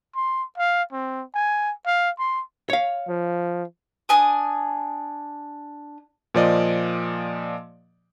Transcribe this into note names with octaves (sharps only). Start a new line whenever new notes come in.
C6
F5
C4
G#5
F5
C6
C#5 F5
F3
D4 G#5 D#6
A#2 F3 D5 D#5